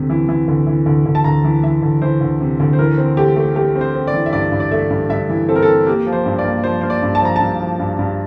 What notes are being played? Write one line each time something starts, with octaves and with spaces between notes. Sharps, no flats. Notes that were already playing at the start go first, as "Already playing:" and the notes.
Already playing: D2 C3
E3
E3
D2
E3
D2
D2
A5
D2 A#5
E3
E3 E5
D2
E3 C5
D2
C3
D2
C5
E3 A#4
C4
A3 G4
A3
A3 G4
C4
C5
C4
D5
E3
E5
G2 D5
G2
D5
A3 E5
G2
G2 E5
E3
C4 A4
A#4
A4
C4
A#3 G4
F3
C5
G2
D5
A#3
F3 C5
A#3 C5
D5
G2
A5
F3 A#5
G2 A5
F3
G2
G2